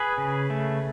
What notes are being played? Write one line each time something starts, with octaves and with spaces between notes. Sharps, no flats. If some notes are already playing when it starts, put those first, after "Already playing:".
Already playing: G#4 B4
C#3
A3